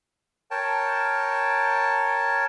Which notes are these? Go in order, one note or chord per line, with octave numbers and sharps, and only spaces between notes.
A#4 C#5 G5 A5